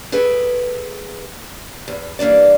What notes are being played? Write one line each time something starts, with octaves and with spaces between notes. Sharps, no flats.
G#4 A4 B4 G5
E2
G2 E3 A#3 D4 D5